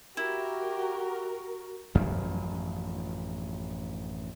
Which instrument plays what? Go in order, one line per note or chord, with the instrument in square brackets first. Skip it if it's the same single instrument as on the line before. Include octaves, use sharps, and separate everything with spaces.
[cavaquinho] E4 [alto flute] F#4 [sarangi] G4 [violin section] A#4
[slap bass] A1 F#2 F3